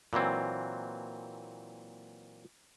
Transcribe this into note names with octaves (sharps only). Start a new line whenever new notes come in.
A#2 E3 F#3 C4